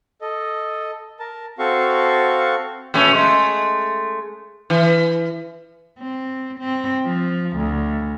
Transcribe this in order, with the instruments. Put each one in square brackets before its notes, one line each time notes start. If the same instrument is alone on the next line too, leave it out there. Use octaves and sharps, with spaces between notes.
[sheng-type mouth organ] A4 D#5
A#4 A5
C4 F#4 A4 F5 C#6
[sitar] A#2 A3 C#4
G#3 A3
E3
[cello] C4
C4
F3
D2